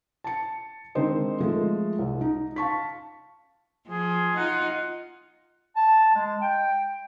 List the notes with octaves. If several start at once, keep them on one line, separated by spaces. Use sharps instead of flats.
A5 C#7
D#3 G#3 C4 D4 C5 D#5
F3 G#3 A3 A4
C2
D#4
F5 A5 C#6 B6
F3 G#4
D#4 F4 F#5
A5
G#3
G5